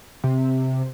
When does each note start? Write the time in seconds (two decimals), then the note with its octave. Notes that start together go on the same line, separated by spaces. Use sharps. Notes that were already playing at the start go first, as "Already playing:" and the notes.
0.24 C3